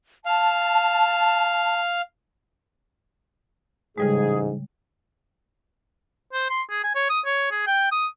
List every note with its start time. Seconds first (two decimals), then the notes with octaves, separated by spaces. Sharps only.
0.25 F5 A5
3.98 A1 G#2 C#3 G3 G#3 G#4
6.33 C5
6.50 C6
6.70 G#4
6.84 G#5
6.95 C#5
7.10 D#6
7.26 C#5
7.51 G#4
7.67 G5
7.92 D#6